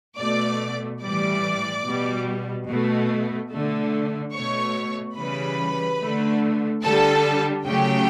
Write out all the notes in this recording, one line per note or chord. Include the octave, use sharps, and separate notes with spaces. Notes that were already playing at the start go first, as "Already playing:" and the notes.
B2 A3 D5 D6
A2 E3 G3 D5 D6
B2 G3
B2 A3
D3 A3
B2 A3 C#5 C#6
C#3 E3 G3 B4 B5
D3 A3
D3 G3 A4 A5
C#3 F#3 A3 G4 G5